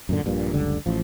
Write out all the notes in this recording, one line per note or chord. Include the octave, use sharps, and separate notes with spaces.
F#2 A#2 D3
A#1 G2 A#2
F#1 C#2 D3 G3
A1 F3